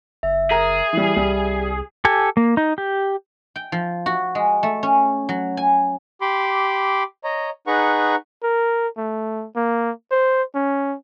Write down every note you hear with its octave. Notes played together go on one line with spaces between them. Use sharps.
F#1 E5
G#4 A#4 A#5
E3 G3
C2 G3
G4 A4 G#5
A#3
D#4
G4
G5
F3
F#4
G#3
A3
C#4
F#3
G#5
G4 B5 C6 D6
C#5 D#5 A#5
D#4 G#4 B4 F#5 A#5 C#6
A#4
A3
A#3
C5
C#4